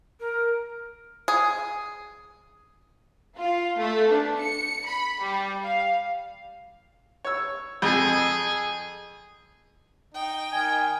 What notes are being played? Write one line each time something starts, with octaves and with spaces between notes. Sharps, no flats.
A#4
G#4
F4
A3
D4
C#7
B5
G3
F5
C#5 E6
F2 G#4
D#4 G5
D#3 D#4 G#5